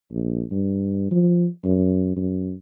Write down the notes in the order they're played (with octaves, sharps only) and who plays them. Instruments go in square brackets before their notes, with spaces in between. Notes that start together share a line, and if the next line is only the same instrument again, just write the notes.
[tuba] A#1
G2
F3
F#2
F#2